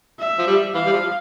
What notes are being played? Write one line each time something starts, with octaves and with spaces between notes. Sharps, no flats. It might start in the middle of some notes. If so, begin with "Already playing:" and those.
E5
F3
G3
E3 F5
G3
F3